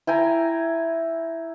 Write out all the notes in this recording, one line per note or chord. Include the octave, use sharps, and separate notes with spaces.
E4 G5 G#5 A#5